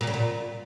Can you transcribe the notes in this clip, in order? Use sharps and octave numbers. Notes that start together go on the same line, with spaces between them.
A#2
C#3
A#2